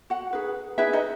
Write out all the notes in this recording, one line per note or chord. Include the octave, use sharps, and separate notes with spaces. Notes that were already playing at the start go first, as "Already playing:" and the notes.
F#4 F#5
D#4 G#4 B4
D#4 E4 G#4 B4 E5
D#4 D#5